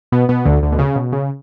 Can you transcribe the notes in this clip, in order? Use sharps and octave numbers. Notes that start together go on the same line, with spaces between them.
B2 B3
B2 B3
D2 D3
D2 D3
B2
C#3
B2
C#3